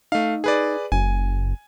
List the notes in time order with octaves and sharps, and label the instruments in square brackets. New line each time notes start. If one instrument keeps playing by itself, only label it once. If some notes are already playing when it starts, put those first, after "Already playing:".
[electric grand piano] A3 F5 [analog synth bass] D#4
[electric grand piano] G#4 B4 D5
[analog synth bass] F#1 [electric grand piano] G#5